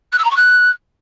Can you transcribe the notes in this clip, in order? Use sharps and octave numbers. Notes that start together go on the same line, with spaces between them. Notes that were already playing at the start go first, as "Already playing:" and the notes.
F#6
E6
A#5
C#6
F#6